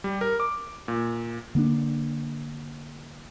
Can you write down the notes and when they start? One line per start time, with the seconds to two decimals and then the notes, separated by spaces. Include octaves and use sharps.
0.04 G3
0.21 A#4
0.40 D6
0.88 A#2
1.55 D3 A#3 B3 D4